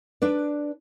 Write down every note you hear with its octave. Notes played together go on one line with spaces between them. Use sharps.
D4 B4 D5